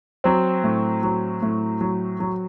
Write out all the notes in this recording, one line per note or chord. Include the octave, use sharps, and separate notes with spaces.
F#3 C4
A2
F#3
A2
F#3
F#3